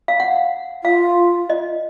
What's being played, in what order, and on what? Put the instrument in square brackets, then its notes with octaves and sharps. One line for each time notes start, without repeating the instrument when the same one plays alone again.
[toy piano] F5
F#5
[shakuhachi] F4 [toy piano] F5
[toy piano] D#5